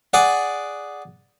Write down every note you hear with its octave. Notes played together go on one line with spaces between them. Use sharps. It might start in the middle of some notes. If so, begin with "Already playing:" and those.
G#4 D5 F#5